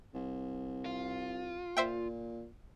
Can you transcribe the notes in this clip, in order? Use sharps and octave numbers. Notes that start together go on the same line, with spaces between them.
C2
F4
A#2 C5 E5 G5